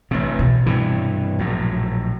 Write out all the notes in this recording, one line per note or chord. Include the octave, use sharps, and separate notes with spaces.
A1 G2 C3
B2
G2 C3 E3
A#1 A2 F#3